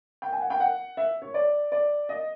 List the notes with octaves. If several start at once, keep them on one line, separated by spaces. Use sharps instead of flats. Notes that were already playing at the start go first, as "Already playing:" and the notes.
G5
G#5
F#5
G5
F#5
E5
C#5
D5
D5
D#5